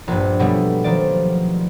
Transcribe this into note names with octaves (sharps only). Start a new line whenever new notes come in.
A#1 G2
B2 F#3 G3 A3 B3
D#3 F3 D5